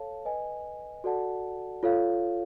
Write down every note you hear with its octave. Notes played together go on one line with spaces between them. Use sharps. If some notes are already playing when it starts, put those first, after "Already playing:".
Already playing: A4 C#5 F5 A5
B4 D#5 G#5
F#4 A4 D5 F#5 A5
F4 A4 C#5 F5